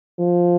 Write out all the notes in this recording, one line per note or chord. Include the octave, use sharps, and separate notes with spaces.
F3